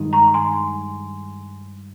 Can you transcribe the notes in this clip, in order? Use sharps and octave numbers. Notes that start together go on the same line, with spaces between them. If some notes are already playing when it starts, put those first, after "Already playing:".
Already playing: G2 D#3 G#3 D#4
A#5 C#6
G#5 C6